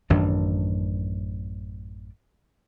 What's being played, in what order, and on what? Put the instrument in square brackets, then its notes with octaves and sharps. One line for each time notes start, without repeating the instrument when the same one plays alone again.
[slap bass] A1 F#2 D#3 D4